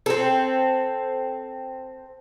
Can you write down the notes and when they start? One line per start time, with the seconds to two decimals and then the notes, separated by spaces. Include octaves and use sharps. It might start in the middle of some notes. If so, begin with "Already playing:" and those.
0.06 C4 A4